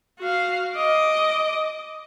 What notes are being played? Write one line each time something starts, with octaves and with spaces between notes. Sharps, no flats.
F#4 F5
D#5 D6